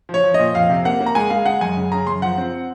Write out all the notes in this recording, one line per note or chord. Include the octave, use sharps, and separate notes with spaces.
F3
C#5
F3
A#2 D#5
F2 F5
C3
A#3 F#5
A#3
A#5
G#3 G#5
G#3 F5
G#3 F#5
F#2 G#5
C#3
C#3 A#5
F#2 C6
F3 F#5
C4